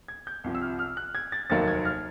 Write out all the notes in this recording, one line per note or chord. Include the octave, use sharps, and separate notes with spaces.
G#6
G6
C2 C3 F3
E6
F6
F6
F#6
G#6
A6
F1 D#2 D#3 F#3 A#3 A6
G#6
F6